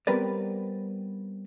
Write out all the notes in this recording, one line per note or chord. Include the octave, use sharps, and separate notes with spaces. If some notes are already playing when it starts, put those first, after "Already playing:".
G3 B3 C4 A#4 B4 D5